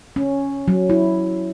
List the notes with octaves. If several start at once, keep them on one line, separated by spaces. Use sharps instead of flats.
C#4
F#3
E4